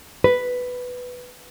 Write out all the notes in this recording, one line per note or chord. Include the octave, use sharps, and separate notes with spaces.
B4